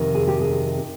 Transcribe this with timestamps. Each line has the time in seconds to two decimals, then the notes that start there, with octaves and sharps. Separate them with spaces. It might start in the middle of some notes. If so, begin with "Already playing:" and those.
Already playing: F2 C3 D#3
0.14 G#4
0.27 G4
0.41 G#4